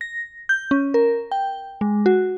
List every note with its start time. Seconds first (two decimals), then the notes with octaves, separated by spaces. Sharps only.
0.01 A#6
0.49 G6
0.71 C#4
0.94 A#4
1.31 G5
1.81 G#3
2.06 F#4